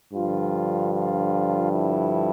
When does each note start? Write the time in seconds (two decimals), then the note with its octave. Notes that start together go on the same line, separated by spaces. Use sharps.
0.14 G2 D3 F3 F4
0.93 F4
1.72 E4